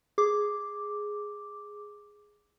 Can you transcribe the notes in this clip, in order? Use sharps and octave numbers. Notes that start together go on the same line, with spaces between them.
G#4 D6